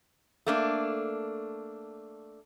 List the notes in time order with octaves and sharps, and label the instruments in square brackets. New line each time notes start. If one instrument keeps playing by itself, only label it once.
[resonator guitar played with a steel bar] A3 A#3 D4